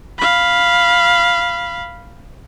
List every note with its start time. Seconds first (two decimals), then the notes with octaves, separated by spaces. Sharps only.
0.18 F5 B5